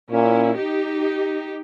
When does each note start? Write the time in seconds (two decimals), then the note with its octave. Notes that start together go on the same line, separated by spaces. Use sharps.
0.11 A#2 C#4 E4
0.55 D#4 G4